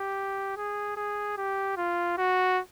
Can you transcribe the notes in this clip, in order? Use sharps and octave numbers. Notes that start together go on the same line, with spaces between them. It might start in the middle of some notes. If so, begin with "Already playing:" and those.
Already playing: G4
G#4
G#4
G4
F4
F#4